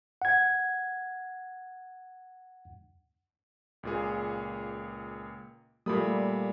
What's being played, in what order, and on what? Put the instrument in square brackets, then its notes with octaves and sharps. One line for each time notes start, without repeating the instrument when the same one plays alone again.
[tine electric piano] F#5 G#6
[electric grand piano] C#2 A#2 G#4
[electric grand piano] A#2 B5 D#6 [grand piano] G3 A3 A#3